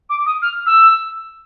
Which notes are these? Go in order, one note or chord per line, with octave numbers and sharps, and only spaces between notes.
D6
D#6
F6
E6